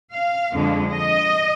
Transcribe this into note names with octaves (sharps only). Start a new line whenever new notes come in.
F5
F2 D3 G#3
D#5